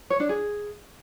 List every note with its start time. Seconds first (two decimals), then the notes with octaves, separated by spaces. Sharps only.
0.10 C#5
0.20 D4
0.29 G#4